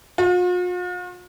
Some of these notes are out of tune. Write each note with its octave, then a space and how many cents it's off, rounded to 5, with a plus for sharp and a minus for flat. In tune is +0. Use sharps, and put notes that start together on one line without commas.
F4 +45